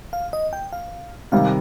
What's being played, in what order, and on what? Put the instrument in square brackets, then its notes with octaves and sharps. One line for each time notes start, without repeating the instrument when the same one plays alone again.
[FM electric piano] F5
D#5
G5
F5
[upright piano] C3 D#3 G3 [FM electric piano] F5